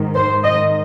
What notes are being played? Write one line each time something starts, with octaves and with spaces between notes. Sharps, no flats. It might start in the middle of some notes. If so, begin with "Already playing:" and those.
Already playing: G#2 D#3
C5
D#5